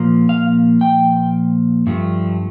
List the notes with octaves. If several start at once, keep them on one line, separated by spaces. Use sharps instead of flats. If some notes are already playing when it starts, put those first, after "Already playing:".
Already playing: A#2 F3 A#3
F5
G5
G2 F3 A3